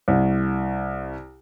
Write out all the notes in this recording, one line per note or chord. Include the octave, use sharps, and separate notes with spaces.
C2